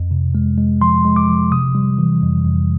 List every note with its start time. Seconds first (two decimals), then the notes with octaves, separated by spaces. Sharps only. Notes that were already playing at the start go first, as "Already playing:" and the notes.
Already playing: F2
0.11 C3
0.35 G#3
0.58 G#3
0.81 F3 C6
1.05 G#3
1.16 D6
1.28 F3
1.52 C3 D#6
1.75 G3
1.99 E3
2.22 F2
2.45 F2